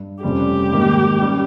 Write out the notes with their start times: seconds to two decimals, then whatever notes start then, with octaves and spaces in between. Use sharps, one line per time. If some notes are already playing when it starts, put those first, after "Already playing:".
Already playing: G2
0.23 F1 F2 C#3 G3 C#4 G4
0.71 G#2 D#3 A#3 D#4
1.19 G3 C#4